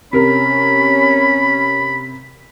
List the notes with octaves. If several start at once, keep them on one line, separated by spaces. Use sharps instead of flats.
C3 C#4 A#4 B5